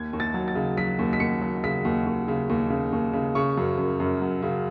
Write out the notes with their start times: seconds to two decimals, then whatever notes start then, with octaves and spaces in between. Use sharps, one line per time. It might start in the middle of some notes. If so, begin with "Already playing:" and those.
Already playing: D#2 G#6
0.13 D#2
0.20 A6
0.34 F#3
0.48 A6
0.55 C#3
0.77 F#3 B6
0.99 D#2
1.13 B6
1.20 D#2 C#7
1.41 F#3
1.64 C#3 B6
1.85 D#2
2.06 D#2
2.28 C#3
2.49 D#2
2.70 C#3
2.92 D#2
3.13 C#3
3.35 C#3 C#6
3.57 F#2
3.78 F#2
4.00 F#2
4.21 F#3
4.42 C#3